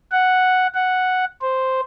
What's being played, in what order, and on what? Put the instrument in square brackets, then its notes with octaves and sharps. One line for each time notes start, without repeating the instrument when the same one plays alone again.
[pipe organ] F#5
F#5
C5